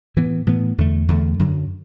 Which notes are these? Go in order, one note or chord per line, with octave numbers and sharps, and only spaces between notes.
A2 E3 B3
A2 E3 B3
E2 D3 A3
E2 D3 A3
F#2 D3 F#3